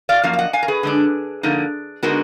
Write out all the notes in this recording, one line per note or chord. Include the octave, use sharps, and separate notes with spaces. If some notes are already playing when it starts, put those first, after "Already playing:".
D5 F5
F#2 F3 A#3 F5
F5
D#5 F#5
F5 G#5
A#4
G#4 B4
D3 G#3 D4
D3 F3 A#3 D#4
D3 G#3 B3 D#4 F#4 A#4